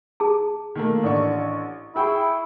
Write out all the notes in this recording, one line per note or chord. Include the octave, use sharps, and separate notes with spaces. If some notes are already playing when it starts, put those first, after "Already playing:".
G#4 A5
D#3 A3 A#3
A1 D4 C#6
E4 G#4 G5 C#6